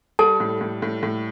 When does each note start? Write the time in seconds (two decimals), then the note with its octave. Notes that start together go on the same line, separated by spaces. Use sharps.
0.19 G3 A4 A5
0.40 A2
0.61 A2
0.82 A2
1.03 A2